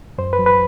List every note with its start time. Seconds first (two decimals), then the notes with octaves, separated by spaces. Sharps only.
0.18 F#2 C5
0.33 B4
0.39 F#3
0.46 B4